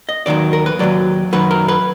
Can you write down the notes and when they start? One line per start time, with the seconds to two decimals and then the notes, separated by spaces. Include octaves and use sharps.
0.09 D#5
0.26 D#2 D#3 F#3 D5
0.53 A#4
0.66 B4
0.79 D#2 D#3 F#3 D5
1.33 F#2 D#3 F#3 B4
1.51 A#4
1.68 B4